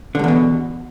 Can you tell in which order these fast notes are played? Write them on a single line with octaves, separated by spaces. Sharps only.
D3 G2 E2 B2